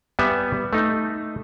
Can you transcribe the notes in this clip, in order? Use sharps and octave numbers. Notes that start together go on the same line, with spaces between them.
G3 B3 E5 G#5
A3 D#4